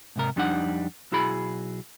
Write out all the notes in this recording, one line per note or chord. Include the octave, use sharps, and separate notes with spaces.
G#2 C3 A#4
F2 G3 D4 D#4 F#5
B1 E4 F#4 G#4 B5